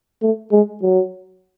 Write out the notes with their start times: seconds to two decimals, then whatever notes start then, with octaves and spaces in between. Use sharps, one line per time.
0.22 A3
0.52 G#3
0.82 F#3